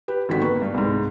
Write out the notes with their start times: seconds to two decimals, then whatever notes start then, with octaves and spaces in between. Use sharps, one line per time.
0.08 G4 B4
0.29 G#1 D3 D#3 F#4 B6
0.41 A#3 B4 C#6
0.62 G2
0.74 C2 G#2